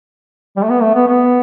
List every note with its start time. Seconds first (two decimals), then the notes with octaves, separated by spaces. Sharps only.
0.56 G3
0.63 A3
0.69 B3
0.82 A3
0.95 B3
1.08 B3